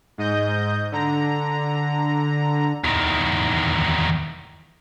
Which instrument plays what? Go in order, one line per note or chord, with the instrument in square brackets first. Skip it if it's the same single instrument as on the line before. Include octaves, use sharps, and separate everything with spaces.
[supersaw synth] G#2 D#5 G6
D3 A#5
[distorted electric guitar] E2 D#3